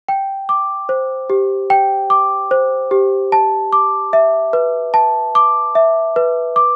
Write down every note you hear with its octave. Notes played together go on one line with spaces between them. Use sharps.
G5
D6
C5
G4
G5
D6
C5
G4
A5
D6
E5
B4
A5
D6
E5
B4
D6